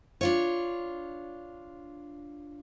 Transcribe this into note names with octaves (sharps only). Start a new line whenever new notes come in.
D4 F4 C#5